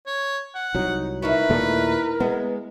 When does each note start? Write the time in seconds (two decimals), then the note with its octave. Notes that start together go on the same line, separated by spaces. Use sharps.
0.06 C#5
0.55 F#5
0.75 C2 F#3 D#4
1.22 D#4 E4 F#4 A#4 B4
1.49 D#2 A#2 A3
2.20 G#3 B3